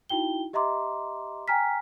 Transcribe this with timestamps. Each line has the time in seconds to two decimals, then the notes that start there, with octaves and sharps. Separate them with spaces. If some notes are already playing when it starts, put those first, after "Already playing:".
0.09 D#4 E4 F#4 G5 G7
0.53 G4 D#5 E5 A#5 C6 D6
1.48 G5 G#5 A#5 F6 B6